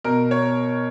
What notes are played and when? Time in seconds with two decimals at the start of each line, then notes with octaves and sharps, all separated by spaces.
0.04 B2 A#4
0.31 C#5